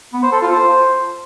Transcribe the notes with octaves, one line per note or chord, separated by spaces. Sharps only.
B3
C5
A4
F4
C5